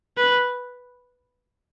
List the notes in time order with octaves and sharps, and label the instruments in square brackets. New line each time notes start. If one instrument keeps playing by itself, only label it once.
[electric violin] B4